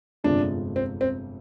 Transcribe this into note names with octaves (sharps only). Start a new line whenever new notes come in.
G1 F2 C3 F3 G#3 D4
C4
C4